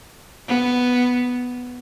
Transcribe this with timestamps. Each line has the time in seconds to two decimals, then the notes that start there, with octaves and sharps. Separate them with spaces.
0.48 B3